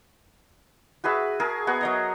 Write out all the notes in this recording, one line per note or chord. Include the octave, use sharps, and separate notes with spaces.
F#4 G#4 B4 E5
G#4 A#4 A5
B3 F#4 G#4 A#4
F#3 D#5 A#5